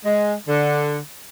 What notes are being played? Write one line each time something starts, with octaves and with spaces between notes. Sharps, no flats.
G#3
D3